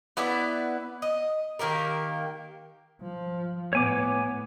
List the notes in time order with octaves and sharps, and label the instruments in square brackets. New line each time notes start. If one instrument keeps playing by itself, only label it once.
[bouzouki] B3 E4 B4 D5
D#5
D#3 A#3 G4 A#4
[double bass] F3
[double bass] A2 B3 [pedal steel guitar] C#5 G#5 D6